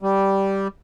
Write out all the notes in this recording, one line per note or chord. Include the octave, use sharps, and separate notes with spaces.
G3